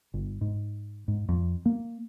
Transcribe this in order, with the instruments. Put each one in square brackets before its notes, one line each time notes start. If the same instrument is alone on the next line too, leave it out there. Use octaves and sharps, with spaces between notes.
[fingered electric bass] G1
G#2
G#2
F2
A#3